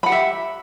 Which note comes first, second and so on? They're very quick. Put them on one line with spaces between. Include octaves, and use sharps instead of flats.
B5 F#5 G4 E5